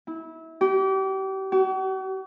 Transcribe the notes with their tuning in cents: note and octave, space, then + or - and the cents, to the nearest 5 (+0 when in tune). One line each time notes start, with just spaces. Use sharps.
E4 -25
G4 -35
F#4 +45